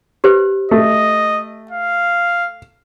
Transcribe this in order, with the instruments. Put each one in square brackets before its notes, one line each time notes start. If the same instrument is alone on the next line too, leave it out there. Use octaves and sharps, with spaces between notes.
[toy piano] G4 B4 C5
[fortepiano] A3 [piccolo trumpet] D#5
[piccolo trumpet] F5